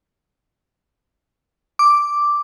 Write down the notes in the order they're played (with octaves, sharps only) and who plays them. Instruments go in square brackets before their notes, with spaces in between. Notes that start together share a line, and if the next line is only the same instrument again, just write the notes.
[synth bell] D6